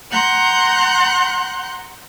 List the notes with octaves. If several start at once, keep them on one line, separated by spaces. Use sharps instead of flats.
F#5 A#5 C6 F#6 G6